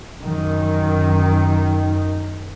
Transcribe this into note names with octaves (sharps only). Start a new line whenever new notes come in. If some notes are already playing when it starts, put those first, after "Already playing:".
F#2 D#3